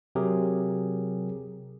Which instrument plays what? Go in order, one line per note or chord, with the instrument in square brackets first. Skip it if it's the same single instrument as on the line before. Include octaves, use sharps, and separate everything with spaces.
[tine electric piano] C3 F#3 G4 G#4 A#4